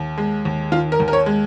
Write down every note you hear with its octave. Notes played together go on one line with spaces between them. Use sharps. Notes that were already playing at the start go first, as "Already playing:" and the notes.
Already playing: D#2
G#3
D#2
D#3 F4
A#4
D#2
A#4
C#5
G#3